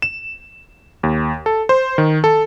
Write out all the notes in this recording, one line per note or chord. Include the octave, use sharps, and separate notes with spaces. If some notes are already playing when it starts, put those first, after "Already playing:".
E7
D#2
A4
C5
D#3
A4